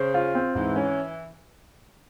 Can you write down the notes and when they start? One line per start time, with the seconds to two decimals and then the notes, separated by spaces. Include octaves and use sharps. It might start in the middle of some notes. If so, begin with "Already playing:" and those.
Already playing: C#3 C5
0.14 F4
0.35 C4
0.55 G#2 E3
0.76 C#4